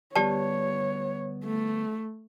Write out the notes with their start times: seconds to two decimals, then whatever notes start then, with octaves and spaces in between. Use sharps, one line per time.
0.16 D2 G3 B3 G4 C#5 D5 A5
1.45 A3